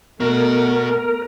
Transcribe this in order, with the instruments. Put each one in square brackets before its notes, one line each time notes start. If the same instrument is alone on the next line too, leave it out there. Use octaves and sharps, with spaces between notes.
[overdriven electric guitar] B2 F#4 [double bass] A3 B3 [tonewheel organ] A#4